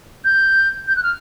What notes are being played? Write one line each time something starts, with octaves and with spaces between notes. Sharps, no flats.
G6
G6
F#6
F6